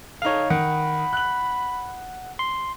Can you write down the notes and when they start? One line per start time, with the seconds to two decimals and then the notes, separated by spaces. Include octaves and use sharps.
0.22 D#4 A4 C#5 F5 F7
0.50 D#3 F#5 B5
1.13 F#6 F#7
2.39 C6